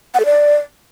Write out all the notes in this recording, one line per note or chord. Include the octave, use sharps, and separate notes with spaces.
F#5
A4
D5